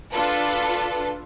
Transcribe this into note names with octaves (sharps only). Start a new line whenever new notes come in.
D4 F4 A4 B4